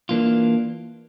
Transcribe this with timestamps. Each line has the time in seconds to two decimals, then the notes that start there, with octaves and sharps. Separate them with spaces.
0.09 E3 A#3 D4 F4